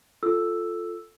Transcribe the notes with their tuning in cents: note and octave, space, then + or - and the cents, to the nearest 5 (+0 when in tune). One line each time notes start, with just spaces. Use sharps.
F4 +0 A4 +0 E6 +0